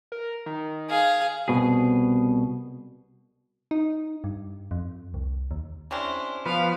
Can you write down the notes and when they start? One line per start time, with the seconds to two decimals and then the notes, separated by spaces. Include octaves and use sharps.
0.12 A#4
0.46 D#3
0.90 G#4 F5
1.48 C2 B2 G#4
3.71 D#4
4.24 G2
4.71 F2
5.14 C2
5.51 D#2
5.91 C3 C#4 D4 E4 C5
6.46 F3 B3 F4 B4 F5